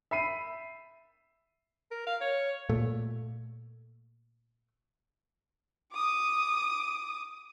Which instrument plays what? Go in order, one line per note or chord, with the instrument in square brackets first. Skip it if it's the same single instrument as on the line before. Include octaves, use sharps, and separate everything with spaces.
[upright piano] E5 B5 C7 D#7
[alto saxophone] A#4
F5
C#5
[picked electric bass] A#2 A3
[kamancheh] D6 D#6